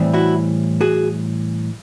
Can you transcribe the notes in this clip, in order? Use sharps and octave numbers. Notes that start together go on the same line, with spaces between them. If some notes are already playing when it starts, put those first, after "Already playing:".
Already playing: A2 E3 G3 C4
E4 F#4
F#4 G#4